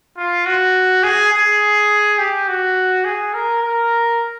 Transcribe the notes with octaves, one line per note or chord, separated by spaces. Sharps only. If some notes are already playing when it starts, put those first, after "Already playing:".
F4
F#4
G#4
G#4
G4
F#4
G#4
A#4
A#4